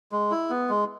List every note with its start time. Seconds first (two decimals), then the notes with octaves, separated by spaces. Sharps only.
0.12 G#3
0.31 E4
0.50 B3
0.70 G#3